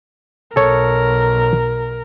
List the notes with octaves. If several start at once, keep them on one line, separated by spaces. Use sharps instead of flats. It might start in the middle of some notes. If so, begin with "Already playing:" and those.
B1 A4 A#4 C#5